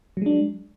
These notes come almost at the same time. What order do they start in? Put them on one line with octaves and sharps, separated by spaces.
F#3 G#3 D4